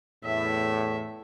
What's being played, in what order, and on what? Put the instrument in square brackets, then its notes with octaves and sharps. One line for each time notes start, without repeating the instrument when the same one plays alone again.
[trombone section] E2 A2 [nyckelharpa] E5